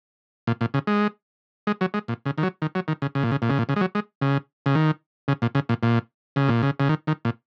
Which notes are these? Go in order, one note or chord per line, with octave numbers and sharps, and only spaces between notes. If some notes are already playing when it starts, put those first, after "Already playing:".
A#2
A#2
C#3
G#3
G#3
F#3
G#3
A#2
C#3
D#3
F#3
D#3
F#3
D#3
C#3
C#3
A#2
C#3
A#2
C#3
A#2
C#3
G#3
F#3
G#3
C#3
C#3
D#3
C#3
A#2
C#3
A#2
A#2
C#3
A#2
C#3
C#3
D#3
D#3
A#2